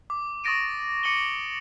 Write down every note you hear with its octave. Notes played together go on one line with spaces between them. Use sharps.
D6
C#6 D#6 A6 A#6 D7 D#7
D6 C#7 D#7 F#7 G7